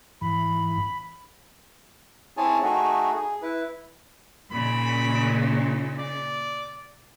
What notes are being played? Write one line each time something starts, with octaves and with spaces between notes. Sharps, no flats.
G#2 E3 B5
C4 E4 G#4 C#5 G#5 A5
A3 D#4 F#4 G#4
G#4
E4 B4
A#2 C#3 D#4 B5
D5